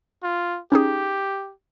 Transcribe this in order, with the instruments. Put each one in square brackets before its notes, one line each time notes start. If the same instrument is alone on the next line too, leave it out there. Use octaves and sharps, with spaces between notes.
[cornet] F4
[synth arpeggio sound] C#4 D#4 G#4 [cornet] G4